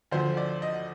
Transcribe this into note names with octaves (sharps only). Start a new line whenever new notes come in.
D2 D3 F3 C5
D5
D#5